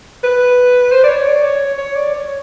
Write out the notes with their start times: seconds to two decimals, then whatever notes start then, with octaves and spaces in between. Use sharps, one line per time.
0.23 B4
0.92 C5
1.04 D5
1.09 C#5
1.27 D5
1.44 C#5
1.78 C#5
1.95 D5
2.14 C#5